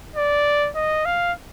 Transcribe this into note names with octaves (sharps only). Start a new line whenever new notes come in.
D5
D#5
F5